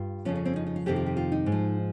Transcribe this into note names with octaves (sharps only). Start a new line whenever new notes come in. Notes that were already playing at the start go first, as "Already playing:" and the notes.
Already playing: G2 F4
F2 C#3 F3 C#4
C#4
C4
D#4
D#4
F4
F2 C3 D#3 G4
F4
G4
F4
D#4
G#2
F3